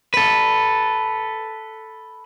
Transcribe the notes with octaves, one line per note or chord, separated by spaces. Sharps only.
A4 B4